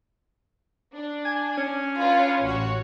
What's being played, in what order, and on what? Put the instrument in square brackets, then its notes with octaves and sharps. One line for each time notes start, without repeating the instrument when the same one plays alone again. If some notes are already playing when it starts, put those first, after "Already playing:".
[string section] D4
[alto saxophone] G#5
C#4
[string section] D4 F4 B4
A1 F#4 C#5